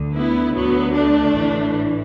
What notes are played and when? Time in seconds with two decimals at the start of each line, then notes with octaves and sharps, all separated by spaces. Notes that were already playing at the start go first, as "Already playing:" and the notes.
Already playing: D2 D3
0.16 B3 E4
0.55 D2 D3 F#3 B3
0.95 A3 D4
1.35 A1 A2 E3